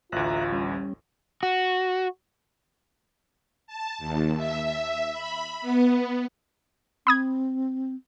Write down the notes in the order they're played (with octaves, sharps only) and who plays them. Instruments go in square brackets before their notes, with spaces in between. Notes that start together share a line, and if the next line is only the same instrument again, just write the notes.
[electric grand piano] A1 D2 [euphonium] F4 [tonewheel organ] E5 A#5 F#6
[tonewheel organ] G3 C#4
[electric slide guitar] F#4
[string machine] A5
D#2
E5
B5
B3
[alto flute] C4 [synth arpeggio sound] B5 D#6 G#6